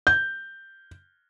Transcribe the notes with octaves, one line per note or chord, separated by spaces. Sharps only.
G6